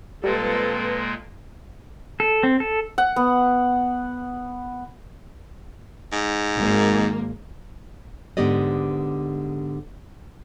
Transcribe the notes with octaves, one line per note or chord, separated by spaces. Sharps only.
F2 A#2 G3 G#3 A#3 A4 B4
A4
C4
A4
F#5
B3
G#2
G#1 A#3
G#2 D3 B3 G4 D5 D#5